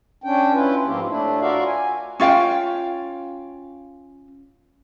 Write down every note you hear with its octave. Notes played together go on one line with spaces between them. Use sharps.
C#4 D4 G5
C#4 E4 F4 B4
G#2 F3 A#3 C4 F4 G4
A2 A3 D4 E4
F4 F#4 A#4 D5 E5 F5
G#5
C#4 F4 F5 G5